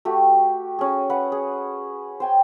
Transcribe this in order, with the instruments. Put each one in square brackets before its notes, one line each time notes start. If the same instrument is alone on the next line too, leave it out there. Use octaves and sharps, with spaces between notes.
[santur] A3 F#4 G4
C#4 G#4
B4 F#5
G#4
C5 G5 G#5